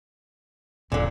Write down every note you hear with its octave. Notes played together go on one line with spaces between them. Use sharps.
D#1 A1 A#2 D3